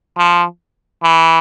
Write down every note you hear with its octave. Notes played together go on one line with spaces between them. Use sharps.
F3
E3